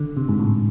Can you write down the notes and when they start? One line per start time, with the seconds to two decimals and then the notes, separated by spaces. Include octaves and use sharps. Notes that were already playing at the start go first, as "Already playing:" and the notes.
Already playing: D3
0.17 C3
0.29 G#2
0.39 A2